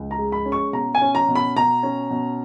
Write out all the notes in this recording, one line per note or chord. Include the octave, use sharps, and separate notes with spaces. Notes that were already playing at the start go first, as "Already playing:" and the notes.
Already playing: C#2
A#5
G#3
B5
C#4
C#6
B2 A#5
G#5
C#4
A#5
B2
B5
B2 A#5
C#4
B2